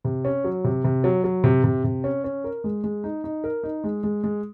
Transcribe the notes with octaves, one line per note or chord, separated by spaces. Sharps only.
C3
C#4
F#3
C3
C3
F#3
F#3
C3
C3
C3
C#4
C#4
A#4
G#3
G#3
D#4
D#4
A#4
D#4
G#3
G#3
G#3